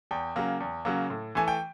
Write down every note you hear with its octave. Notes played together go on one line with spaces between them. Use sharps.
E2 G5
C#3 F#3 A#3
E2
C#3 F#3 A#3
A2
E3 A3 G#5
G5